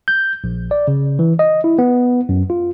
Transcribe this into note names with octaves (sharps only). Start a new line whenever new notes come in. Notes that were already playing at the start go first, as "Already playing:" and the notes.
G6
A#1
D5
C#3
E3
D#5
E4
B3
F#2
F4